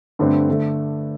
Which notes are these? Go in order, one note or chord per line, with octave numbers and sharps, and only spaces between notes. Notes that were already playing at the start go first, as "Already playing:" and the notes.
G2 D3 A3 C4
D3 A3